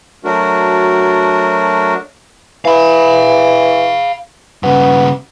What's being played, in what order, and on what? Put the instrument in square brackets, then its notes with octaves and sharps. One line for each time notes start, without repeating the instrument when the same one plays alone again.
[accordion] F#3 A3 D4 F#4 A#4
[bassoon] E3 [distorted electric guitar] F5 B5
[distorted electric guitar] G2 C#3 [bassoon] B3